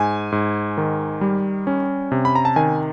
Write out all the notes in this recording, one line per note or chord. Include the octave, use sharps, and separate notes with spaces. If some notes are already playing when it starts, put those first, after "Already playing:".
Already playing: G#2 G#5
G#2
D#3
G3
C#4
C3
B5
A#5
A5
D#3 G#5